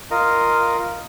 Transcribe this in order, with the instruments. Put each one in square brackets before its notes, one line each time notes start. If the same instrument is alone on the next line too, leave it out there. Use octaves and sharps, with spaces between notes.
[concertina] F4 A#4 D#5